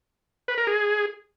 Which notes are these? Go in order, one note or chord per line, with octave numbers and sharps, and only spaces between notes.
B4
A#4
G#4